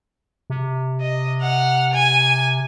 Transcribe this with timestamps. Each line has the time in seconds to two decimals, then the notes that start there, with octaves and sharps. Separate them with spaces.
0.50 C3
1.01 D#5
1.41 F#5 F6
1.93 G#5